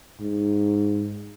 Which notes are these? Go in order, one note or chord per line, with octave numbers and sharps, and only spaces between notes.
G#2